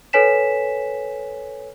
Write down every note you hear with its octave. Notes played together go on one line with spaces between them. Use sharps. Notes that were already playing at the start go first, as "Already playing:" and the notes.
A4 B4 C#5 G#5 B6 E7